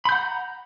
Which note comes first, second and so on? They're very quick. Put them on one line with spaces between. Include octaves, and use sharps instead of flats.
B5 G6 F#5 A#5